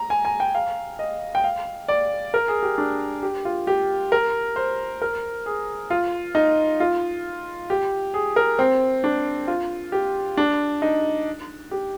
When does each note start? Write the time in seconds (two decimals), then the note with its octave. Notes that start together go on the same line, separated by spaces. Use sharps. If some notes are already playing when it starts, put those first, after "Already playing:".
Already playing: A#5
0.10 G#5
0.25 G#5
0.40 G5
0.55 F5
0.99 D#5
1.35 G5
1.44 F5
1.89 D5
2.34 A#4
2.48 G#4
2.62 G4
2.78 D4
3.23 G4
3.45 F4
3.67 G4
4.12 A#4
4.56 C5
5.02 A#4
5.46 G#4
5.90 F4
6.35 D#4
6.80 F4
7.70 G4
8.14 G#4
8.36 A#4
8.59 C4
9.04 D4
9.47 F4
9.92 G4
10.37 D4
10.82 D#4
11.71 G4